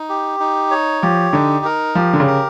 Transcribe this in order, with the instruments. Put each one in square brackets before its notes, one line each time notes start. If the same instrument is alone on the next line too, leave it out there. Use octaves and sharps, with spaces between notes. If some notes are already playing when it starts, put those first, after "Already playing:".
Already playing: [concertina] D#4
G4
D#4
C#5
[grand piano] F3 [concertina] G4
[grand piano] D3 [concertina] D#4
[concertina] A#4
[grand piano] F3 [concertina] G4
[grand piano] D3
C#3
[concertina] A#4